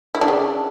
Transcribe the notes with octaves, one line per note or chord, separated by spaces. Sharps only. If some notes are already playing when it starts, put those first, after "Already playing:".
E4
D4
C#3